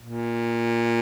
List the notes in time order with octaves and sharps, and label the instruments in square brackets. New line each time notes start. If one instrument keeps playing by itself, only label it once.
[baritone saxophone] A#2